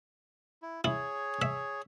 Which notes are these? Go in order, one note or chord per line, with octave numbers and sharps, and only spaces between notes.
E4
E4 G#4 C#5
E5